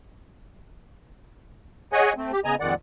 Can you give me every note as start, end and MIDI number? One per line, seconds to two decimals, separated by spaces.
1.93 2.13 68
1.93 2.13 73
1.93 2.13 75
1.93 2.13 78
1.93 2.13 80
2.17 2.32 57
2.17 2.32 60
2.32 2.40 67
2.45 2.55 49
2.45 2.55 59
2.45 2.55 75
2.45 2.55 80
2.45 2.55 82
2.60 2.74 41
2.60 2.74 46
2.60 2.74 51
2.60 2.74 56
2.60 2.74 74
2.60 2.74 78